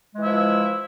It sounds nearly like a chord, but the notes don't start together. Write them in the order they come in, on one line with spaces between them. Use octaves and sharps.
G#3 E3 E4 F3